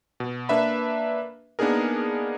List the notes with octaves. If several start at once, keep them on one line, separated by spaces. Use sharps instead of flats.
B2
A#3 D4 B4 E5 B5
A#3 B3 D4 D#4 G#4 A#4